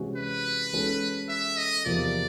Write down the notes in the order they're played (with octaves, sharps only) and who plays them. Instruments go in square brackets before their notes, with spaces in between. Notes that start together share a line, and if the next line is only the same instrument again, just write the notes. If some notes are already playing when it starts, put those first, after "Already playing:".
Already playing: [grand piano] C3 E3 G#3 C#4 F#4
[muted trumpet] B4
[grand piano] E3 G#3 C#4 F#4 A4
[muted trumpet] E5
D#5
[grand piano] E2 C3 F3 A#3 [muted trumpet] D5